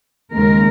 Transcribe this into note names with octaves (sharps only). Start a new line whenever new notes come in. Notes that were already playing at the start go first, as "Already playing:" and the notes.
D#2 C#3 G#3 A#4